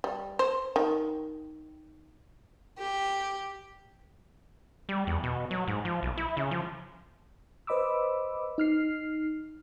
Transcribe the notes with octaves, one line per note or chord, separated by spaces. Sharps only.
G3
C5
D#3
G4
G3
E2
B2
F#3
G#2
F3
B1
E4
C#3
F3
B4 C5 D#5 B5 D6 E6
D#4 F6 C7